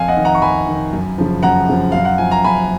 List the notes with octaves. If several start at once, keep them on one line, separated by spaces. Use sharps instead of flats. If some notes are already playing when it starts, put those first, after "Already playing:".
Already playing: F2 F5 G#5
D#5 F#5
D#3
F#5 A#5
C#6
F2 G#5 B5
D#3
F#2
C#3 F3
F#2 F#5 A#5
C#3 F3
F#2 F5
F#5
F3 G#5
A#5
F#2 G#5 B5